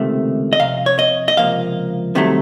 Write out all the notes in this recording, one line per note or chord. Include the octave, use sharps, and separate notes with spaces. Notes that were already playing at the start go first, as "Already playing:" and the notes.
Already playing: C#2 C3 D#3 A3
D#5
F2 C3 F5
C#5
D#5
D#5
C#2 C3 F3 A#3 F5
C2 C3 D#3 F#3 A3